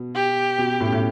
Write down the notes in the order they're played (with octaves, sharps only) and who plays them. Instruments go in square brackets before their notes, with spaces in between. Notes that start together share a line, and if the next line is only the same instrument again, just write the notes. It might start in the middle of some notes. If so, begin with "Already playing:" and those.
Already playing: [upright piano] B2
[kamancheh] G4
[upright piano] B2
A2
A2